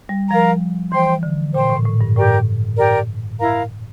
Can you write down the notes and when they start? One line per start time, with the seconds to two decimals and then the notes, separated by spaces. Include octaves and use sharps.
0.09 G3
0.30 F3 A#4 F5 A#5
0.92 E3 C5 G5 C6
1.23 D3
1.54 A#2 C5 G5 C6
1.70 A2
1.85 A2
2.01 G2
2.16 A2 G4 A#4 D5 G5
2.78 G4 A#4 D5 G5
3.39 E4 A#4 F5 A#5